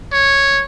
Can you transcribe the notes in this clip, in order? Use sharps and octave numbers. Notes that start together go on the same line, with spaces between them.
C#5